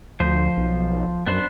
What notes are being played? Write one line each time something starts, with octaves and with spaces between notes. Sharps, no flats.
D2 F3 C5
B1
F#2 B3 D4 C5